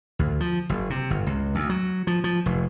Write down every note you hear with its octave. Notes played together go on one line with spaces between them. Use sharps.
D2
F3
F#1
C3
G1
C#2
D2
F#3
F3
F3
F1